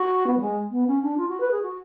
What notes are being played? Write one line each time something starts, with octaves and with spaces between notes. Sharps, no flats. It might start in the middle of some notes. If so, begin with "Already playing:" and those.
Already playing: F#4
B3
F#3
G#3
B3
C#4
D4
F4
F#4
B4
G#4
F#4